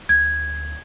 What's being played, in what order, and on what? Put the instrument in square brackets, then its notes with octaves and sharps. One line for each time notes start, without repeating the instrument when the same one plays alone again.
[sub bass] D2 [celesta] G#6